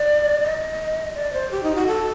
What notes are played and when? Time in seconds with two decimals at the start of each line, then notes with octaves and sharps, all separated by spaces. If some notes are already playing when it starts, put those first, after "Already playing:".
Already playing: D5
0.43 D#5
1.15 D5
1.33 C5
1.51 G4
1.63 D#4
1.75 F#4
1.87 A4